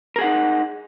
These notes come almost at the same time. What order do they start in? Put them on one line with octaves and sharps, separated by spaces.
A#4 G#4 F#5 D#4